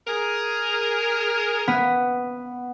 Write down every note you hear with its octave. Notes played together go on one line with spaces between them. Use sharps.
G#4 A#4
B3